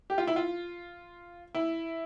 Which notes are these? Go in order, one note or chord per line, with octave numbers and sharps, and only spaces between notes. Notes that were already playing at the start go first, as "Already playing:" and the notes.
G4
F4
E4
F4
E4